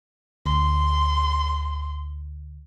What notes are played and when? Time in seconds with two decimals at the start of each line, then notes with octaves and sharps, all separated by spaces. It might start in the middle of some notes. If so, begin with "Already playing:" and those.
0.46 D2 C6